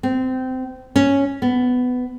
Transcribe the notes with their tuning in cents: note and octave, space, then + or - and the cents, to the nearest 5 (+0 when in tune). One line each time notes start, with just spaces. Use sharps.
C4 -20
C#4 +0
B3 +15